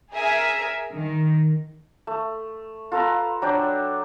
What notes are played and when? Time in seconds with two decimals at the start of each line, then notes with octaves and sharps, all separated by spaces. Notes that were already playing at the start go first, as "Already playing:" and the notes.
0.14 G#4 A#4 E5 G#5
0.93 D#3
2.07 A3
2.92 F4 A4 B4 A#5
3.42 F#3 D4 D5 G5